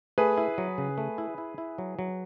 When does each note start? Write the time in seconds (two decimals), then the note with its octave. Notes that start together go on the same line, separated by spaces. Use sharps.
0.18 A3 G#4 B4
0.38 E4
0.58 F#3
0.78 C#3
0.98 A3
1.18 E4
1.38 E4
1.58 E4
1.78 F#3
1.99 F#3